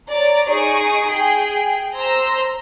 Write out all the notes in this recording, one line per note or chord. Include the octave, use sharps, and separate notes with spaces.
C#5 D5 A#5
D#4 G#4 C#6 D#6 D7
G#4 G5
C5 A#5 C6 E6